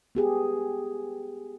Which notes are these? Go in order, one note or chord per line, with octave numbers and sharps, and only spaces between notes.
B3 G4 G#4